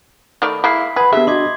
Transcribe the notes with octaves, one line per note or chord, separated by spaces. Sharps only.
D#3 A3 D5 B5
G#3 A#3 E4 B6 C7
G#4 B4 F#5 B5
D3 B3 G4 G#4 E5
D4 F#4 D#5 C6 D6 G#6